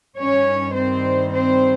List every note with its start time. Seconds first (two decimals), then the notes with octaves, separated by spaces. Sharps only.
0.18 G2 D#3 G3 C#4 C#5
0.76 C4 C5
1.34 C4 C5